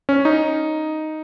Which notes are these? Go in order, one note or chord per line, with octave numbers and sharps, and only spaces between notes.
C#4
D#4